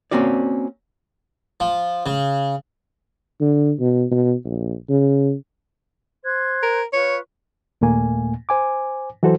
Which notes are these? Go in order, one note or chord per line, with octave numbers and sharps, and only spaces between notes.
A#3 C4 C#4 F#4 D5
F3
C#3
D3
B2
B2
A#1
C#3
C5 F#6 G#6
A#4
F4 B4 C#5 C#6
D#2 A#2 A3 A#3 G#5
C5 G#5 D6
E3 F#3 F#4 A4 C5